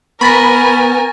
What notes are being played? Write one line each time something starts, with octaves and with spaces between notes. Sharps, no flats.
B3 A#4 G#5 B5 C#6 A6 A#6